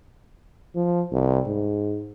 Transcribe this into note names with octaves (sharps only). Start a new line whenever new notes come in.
F3
C2
G#2